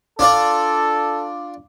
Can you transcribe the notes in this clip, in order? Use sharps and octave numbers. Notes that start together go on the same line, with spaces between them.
D4 F4 A4 D5